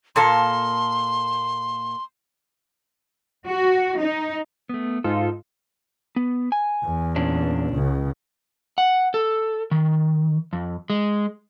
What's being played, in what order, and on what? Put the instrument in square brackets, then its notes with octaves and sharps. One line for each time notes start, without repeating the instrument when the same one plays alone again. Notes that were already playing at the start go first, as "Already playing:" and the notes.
[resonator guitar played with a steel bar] A#2 A#3 A4 [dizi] C6
[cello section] F#4
D#4
[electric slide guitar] A3 B3
[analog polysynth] G#2 F4 [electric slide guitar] D#4 A4
[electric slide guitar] B3
G#5
[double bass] E2
[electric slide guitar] A#2 C#4 D4
[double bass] C#2 C#3
[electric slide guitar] F#5
A4
D#3
F2
G#3